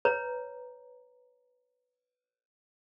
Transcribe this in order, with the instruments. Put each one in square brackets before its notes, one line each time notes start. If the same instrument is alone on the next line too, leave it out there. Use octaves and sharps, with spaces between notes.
[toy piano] B4 C#5 A#5